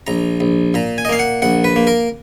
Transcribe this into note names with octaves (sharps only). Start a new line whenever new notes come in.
A#1 A#5
A#1
A#2 A#5
G#5
D#5
A#3 F5
F#5
A#1 F#5
B4
A#3
A#4